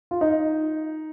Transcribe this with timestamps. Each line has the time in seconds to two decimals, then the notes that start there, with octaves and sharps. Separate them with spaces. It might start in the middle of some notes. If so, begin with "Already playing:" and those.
0.11 F4
0.21 D#4